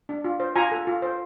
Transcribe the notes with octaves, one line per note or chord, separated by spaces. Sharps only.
D4
F4
C5
F4 G#5 A#5
A4
F4
C5